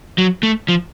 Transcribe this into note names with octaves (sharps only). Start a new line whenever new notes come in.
F#3
A3
F3